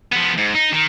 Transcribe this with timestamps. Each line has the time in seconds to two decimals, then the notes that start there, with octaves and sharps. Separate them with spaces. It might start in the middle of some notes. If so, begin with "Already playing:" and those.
0.12 F3 B3
0.38 G#2
0.54 D#4
0.72 D#3